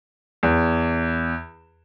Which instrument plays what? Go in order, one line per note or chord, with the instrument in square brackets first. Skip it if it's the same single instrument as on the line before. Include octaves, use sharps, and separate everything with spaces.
[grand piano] E2